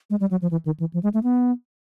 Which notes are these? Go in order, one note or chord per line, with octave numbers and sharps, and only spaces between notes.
G#3
G3
F#3
F3
E3
D#3
E3
F3
G#3
A3
B3